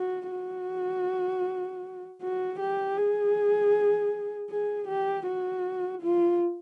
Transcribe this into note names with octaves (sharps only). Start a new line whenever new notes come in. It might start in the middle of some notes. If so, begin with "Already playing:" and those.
Already playing: F#4
F#4
F#4
G4
G#4
G#4
G4
F#4
F4